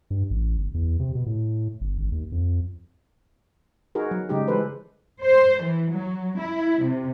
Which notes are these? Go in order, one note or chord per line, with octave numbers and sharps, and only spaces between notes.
G2
A1
G1
E2
C3
B2
A2
G1
G#1
D#2
F2
D#4 F#4 G#4 A#4
F#3
C#3 G3 G#3 D#4 G4
E3 G#3 A4 B4 C5
C5
E3
F#3
E4
C3